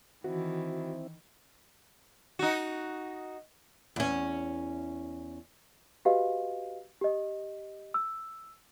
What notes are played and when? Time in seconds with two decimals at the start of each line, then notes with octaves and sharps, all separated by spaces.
0.24 D#3 E3 C4 E4 F#4
2.39 D#4 F#4
3.96 E2 C#4
6.05 F#4 G4 B4 D#5 F5
7.01 G4 D#5
7.94 E6